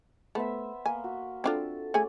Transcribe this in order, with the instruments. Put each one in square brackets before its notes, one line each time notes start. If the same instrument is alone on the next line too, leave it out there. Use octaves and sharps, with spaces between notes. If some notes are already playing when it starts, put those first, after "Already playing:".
[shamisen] A3 [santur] B3 C5 E5
[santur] A#3 [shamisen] G#5
[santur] F#4
[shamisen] C4 D4 F4 [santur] A4
[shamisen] A3 G#4 G#5 [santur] C#4 D5